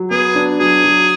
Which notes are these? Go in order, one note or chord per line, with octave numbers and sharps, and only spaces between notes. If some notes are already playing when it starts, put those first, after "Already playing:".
Already playing: F#3
B3 G#4
D4
F#3 G#4
F#3